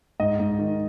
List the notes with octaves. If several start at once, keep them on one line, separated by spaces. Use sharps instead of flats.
G#2 D#5
G#2
D#3